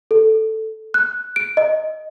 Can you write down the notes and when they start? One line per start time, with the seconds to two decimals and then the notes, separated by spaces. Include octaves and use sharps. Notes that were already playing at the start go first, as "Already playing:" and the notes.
0.11 A4
0.94 F#6
1.36 D7
1.57 D#5